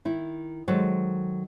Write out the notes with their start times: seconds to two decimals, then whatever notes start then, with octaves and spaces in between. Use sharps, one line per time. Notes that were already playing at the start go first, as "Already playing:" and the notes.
0.05 D#3 E4
0.68 D#3 F#3 G#3 A4 C5